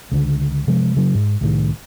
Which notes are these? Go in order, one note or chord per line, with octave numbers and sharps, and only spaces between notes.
C#2 D3
C3 F3 G#3
C#3 F#3
G#2
C2 A2 D#3